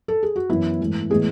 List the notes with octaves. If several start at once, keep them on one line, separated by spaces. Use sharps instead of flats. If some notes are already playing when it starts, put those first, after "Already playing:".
A4
G#4
F#4
F#2 E3 B3 E4
G#2 E3 A3
A2 E3 G#3 B3 G#4